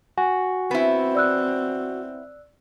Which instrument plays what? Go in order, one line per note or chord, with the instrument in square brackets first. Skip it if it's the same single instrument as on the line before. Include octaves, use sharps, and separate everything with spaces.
[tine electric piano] F#4 [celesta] G#5
[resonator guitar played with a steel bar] B3 E4 [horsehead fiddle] C4
[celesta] D5 E6 F#6